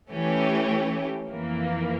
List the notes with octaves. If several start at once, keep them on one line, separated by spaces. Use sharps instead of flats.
E3 A3 C#4 G4
F2 E3 A#3